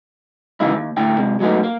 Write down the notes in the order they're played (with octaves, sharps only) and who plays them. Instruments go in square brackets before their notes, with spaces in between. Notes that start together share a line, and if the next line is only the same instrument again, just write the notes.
[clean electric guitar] C#3 E3 G#3 A#3 D#4 E4
D#2
A2 D3 G5
C3 G#3
F#3 G#3 A3 B3 D#4
A#3